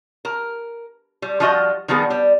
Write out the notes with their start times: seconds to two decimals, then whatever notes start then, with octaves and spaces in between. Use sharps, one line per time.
0.25 A#4
1.22 G3
1.40 F3 G3 F4 F#4 D#5
1.88 D#3 F3 G3 B3 G#4
2.10 G3 D5